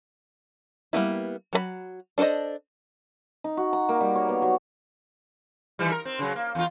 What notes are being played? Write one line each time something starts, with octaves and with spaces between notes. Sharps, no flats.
G3 A#3 B3 E4
F#3 G#4 B5
D4 A4 B4 C5 D#5
D#4
F#4
A#5
A#3
G3
C#5
B3
F#3
D#3 E3 G3
A#4
C4
C#3 F#3
A#3
E2 F4